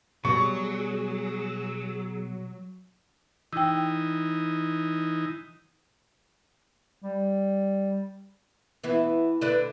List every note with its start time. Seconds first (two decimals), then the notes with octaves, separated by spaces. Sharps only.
0.25 B2 F#3 G3 G#4 D5 C#6
3.53 E3 D#4 G5 E6
7.03 G3
8.84 E3 B3 E4
9.41 D3 B4 D5